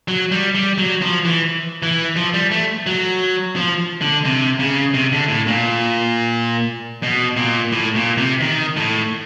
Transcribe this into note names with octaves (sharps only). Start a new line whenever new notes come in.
F#3
G3
G3
F#3
F3
E3
E3
F3
G3
A3
F#3
F3
D3
C3
C#3
C3
D3
A2
A#2
B2
A#2
A2
A#2
C3
D#3
A2